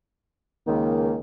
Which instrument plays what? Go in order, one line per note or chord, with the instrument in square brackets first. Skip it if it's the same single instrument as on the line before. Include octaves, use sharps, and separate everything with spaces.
[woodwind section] C#2 D#3 [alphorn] A#3